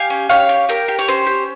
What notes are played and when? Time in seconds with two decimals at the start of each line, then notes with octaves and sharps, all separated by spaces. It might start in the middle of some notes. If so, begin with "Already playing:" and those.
Already playing: G4 F5 G#5
0.10 C#4
0.29 G4 C#5 F5
0.49 G4
0.69 G4 A#4
0.88 G4
0.99 C#5
1.08 C#4 C5
1.26 G4